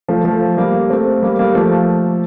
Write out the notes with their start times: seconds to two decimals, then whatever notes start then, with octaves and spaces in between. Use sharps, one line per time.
0.08 F3 A3
0.25 F3 A3
0.57 G3 A#3
0.90 A3 C4
1.22 G3 A#3
1.39 G3 A#3
1.54 F3 A3